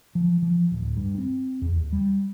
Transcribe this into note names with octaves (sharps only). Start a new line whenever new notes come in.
F3
F3
D1
G2
C4
E2
D#2
G3